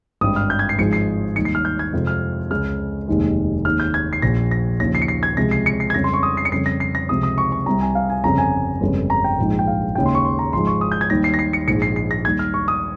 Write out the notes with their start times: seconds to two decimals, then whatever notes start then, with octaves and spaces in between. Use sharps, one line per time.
0.21 G#1 G2 G3 D#6
0.36 F6
0.50 G6
0.59 G#6
0.69 C7
0.79 G#1 G#2 F3 G#3 C#7
0.93 C7
1.36 D#2 D#3 G3 C#7
1.45 C7
1.55 F6
1.65 G6
1.79 G#6
1.93 F2 C3 F3 G#3
2.07 F6
2.50 C#2 C#3 G#3 F6
3.08 F1 D#2 D#3 G#3
3.65 D#2 D#3 G#3 F6
3.80 G6
3.94 G#6
4.13 C7
4.22 A#1 A#2 F3 A#6
4.51 A#6
4.80 D#2 C#3 F3 A#6
4.95 C7
5.02 C#7
5.08 C7
5.23 G#6
5.37 C#2 C3 F3 G#3 A#6
5.51 C7
5.66 C#7
5.80 C7
5.90 G#6
5.94 F2 C#3 G3 A#6
6.04 C6
6.13 C#6
6.23 D#6
6.37 C7
6.45 C#7
6.52 F2 C#3 G3 C7
6.66 A#6
6.80 C7
6.95 A#6
7.09 C#2 C3 F3 D#6
7.23 D#6
7.38 C#6
7.52 C#6
7.66 C2 C3 G3 A#5
7.81 G#5
7.95 F5
8.10 G#5
8.24 G1 F2 C#3 G3 A#5
8.38 G#5
8.81 G1 F2 C#3 G#3
9.10 A#5
9.24 G5
9.38 A#1 G#2 F3 G#3
9.59 G5
9.67 F5
9.95 D#2 C#3 G#3 G5
10.06 C6
10.15 C#6
10.25 C6
10.39 A#5
10.53 G#1 G#2 F3 G#3 C6
10.67 C#6
10.81 D#6
10.92 G6
11.01 G#6
11.10 D#2 D#3 G3 A#6
11.24 C7
11.34 A#6
11.39 C7
11.53 C#7
11.67 A#1 G#2 F3 G#3 C#7
11.82 C7
11.96 C7
12.11 A#6
12.25 D#2 D#3 G3 G#6
12.39 F6
12.54 C#6
12.68 D#6